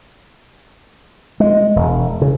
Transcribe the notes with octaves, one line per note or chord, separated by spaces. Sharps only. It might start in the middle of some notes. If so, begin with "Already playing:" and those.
G#3
E1
C#3